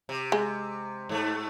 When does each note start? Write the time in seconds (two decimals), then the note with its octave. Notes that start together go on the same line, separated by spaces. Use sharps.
0.09 C3
0.32 G#3
1.09 G#2 A3